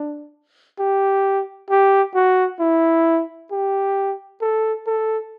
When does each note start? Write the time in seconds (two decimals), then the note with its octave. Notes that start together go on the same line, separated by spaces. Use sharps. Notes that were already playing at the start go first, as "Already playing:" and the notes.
Already playing: D4
0.80 G4
1.70 G4
2.15 F#4
2.60 E4
3.51 G4
4.41 A4
4.87 A4